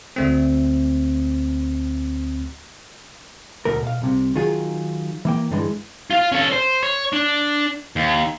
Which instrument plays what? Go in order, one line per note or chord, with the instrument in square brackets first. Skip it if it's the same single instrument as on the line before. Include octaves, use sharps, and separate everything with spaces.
[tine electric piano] D2 A3 C4
[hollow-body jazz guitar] D2 B2 A3 A#4
B2 F5
C2 C3
D#3 F#3 F4 G#4
E3 A#3 G5
G2 D3 E3 G#3
[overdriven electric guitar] F4 F5
C#4 A4
C5
C#5
D4
D#2